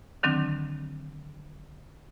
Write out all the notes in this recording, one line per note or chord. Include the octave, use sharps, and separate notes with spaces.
D3 D#3 F#3 C4 D4